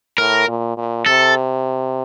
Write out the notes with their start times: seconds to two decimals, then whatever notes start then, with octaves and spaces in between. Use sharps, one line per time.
0.18 A2 A#4
0.47 A#2
0.77 A#2
1.06 C3 A4